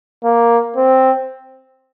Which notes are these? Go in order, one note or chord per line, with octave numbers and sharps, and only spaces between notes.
A#3
C4